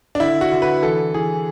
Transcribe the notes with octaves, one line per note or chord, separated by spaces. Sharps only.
D4
D3 E4
F#4
D3
B4
E3 A4
E3 G#4